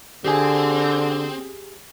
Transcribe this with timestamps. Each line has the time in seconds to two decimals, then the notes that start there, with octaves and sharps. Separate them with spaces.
0.24 D3 C4 G4 G#4 G#5